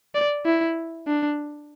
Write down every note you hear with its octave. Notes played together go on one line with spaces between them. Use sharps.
D5
E4
D4